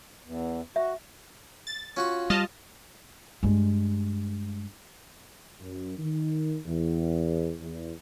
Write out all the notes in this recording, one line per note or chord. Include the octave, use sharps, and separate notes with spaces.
E2
F#4 E5
A6
C#4 F4 F#4 C#6
G3 D#5 A5 F6
G2 G#3
F#2
D#3
E2
E2